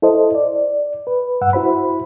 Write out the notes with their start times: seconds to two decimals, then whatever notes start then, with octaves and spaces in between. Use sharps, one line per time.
0.02 E4 A4 C5 D#5
0.35 D5
1.07 B4
1.41 G2 F#5 E6
1.53 E4 F#4 C5 B5